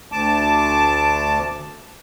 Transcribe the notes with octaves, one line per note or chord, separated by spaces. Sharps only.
D2 A5 D6